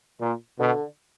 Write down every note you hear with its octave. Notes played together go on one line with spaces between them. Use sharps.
A#2
B2 D3